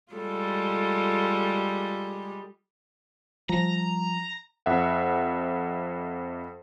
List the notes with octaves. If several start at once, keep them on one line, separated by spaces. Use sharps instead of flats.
G3 G#3 F4 A4
F3 G3 A#5
F2 E5 F#5